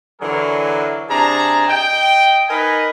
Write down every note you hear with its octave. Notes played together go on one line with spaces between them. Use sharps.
D3 E3 F#3 G#4 A#4
C3 D4 G#4 A5 A#5
D#5 G5
D#4 A#4 B4 D#5 G#5